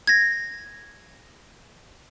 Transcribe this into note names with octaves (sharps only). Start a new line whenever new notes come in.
G#6 A#6